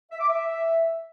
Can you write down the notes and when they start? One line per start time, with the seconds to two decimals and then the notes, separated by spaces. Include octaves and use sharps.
0.12 E5
0.20 D6
0.28 E5